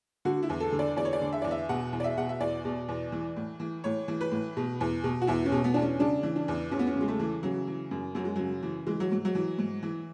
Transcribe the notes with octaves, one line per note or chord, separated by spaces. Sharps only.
D3 F#4
E4
E2
A4
D3
D5
E2 D5
C#5
D5
D3
E5
E2 D5
E5
B2 F#5
E2
D5
E5
B2 F#5
E5
E2 D5
B2
E2
E3
A2
E3
A2 C#5
E3
B4
A2
B2
E2
B2
F#4
E2 E4
C#4
B2
B3
E2 D4
C#4
C#3 D4
E3
D4
E2
E2 C#4
B3
C#4
C#3
G#3
A3
E3
C#3 F#3
E3
F#2
F#2 F#3
G#3
C#3 F#3
E3
E3 G#3
F#3
G#2
F#3
E3
G#2
E3